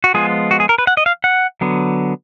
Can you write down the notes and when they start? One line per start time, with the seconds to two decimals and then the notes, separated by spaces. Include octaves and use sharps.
0.04 F#4
0.14 F3 G#3 B3 F4 G#4
0.51 F#4
0.60 G#4
0.69 A#4
0.78 B4
0.87 F#5
0.97 D#5
1.06 F5
1.24 F#5
1.61 D3 F#3 B3